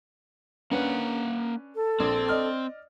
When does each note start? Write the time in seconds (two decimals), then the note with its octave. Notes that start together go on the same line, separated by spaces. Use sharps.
0.71 A#3 C#4 D4 B4 F#5
1.75 A4
2.00 A#1 C4
2.29 D5 D#5 F6